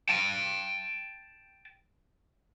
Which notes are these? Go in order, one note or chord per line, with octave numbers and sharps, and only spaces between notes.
G5 A5